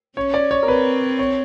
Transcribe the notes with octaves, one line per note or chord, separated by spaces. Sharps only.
C#4 C#5
D5
C#5
A#4
C4 B4
C#5